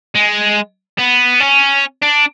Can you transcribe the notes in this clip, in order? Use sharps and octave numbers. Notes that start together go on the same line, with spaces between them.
G#3
B3
C#4
D4